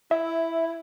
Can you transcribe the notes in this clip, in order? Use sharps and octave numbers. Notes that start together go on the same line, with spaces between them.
E4 E5